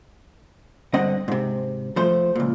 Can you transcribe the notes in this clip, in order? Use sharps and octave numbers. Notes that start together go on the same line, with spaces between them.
G2 D3 C4 D#5 F#5
G#2 C3
F3 A3 C5
C#2 A#2